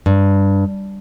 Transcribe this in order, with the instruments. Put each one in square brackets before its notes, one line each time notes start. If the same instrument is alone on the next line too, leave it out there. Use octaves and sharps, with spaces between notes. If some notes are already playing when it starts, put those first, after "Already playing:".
[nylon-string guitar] G2